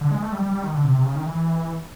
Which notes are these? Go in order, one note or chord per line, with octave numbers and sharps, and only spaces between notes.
D3
G#3
A3
G3
G3
G3
D#3
D3
C3
C3
C#3
D#3
E3